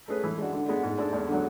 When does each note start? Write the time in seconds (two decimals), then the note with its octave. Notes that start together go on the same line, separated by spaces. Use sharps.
0.08 A3 C#4 G#4 B4
0.24 E3
0.38 G#3 D4 F#4
0.53 D3
0.68 G#3 B3 D4
0.83 G#2
0.98 G#3 D4 A4
1.13 E2
1.27 D3 F#3